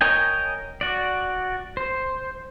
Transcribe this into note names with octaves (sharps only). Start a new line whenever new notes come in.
A#4 C#5 D#5 G5 G#5
F#4 D5
C5